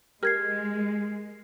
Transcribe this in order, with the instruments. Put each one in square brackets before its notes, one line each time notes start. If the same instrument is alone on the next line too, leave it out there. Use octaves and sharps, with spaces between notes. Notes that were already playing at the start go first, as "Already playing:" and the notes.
[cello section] G#3 [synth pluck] G4 A#4 [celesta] F6 G#6 C7